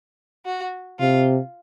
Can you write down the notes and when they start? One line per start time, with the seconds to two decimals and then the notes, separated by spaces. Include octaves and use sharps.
0.45 F#4
1.00 C3 F4